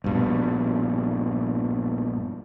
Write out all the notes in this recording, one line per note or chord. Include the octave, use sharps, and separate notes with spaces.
A#1 G2 B2